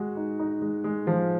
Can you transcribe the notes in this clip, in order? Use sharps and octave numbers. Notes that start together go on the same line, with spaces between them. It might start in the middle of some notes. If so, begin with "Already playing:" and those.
Already playing: G#3 F#4
D#4
D#4
G#3
G#3
F3